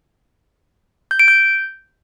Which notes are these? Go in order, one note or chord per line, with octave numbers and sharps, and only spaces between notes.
G6
D7
G6